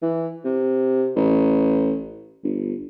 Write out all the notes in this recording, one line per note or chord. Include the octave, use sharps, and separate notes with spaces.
E3
C3
A1
G1